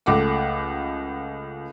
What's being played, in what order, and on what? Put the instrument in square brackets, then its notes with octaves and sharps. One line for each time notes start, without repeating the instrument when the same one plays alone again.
[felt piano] C#2 A3 F#5 D6